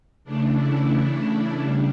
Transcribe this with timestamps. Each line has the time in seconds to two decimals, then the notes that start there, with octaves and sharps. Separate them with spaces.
0.24 C#3 E3 A3 D4
0.57 E4
0.89 D4
1.55 C#3 G3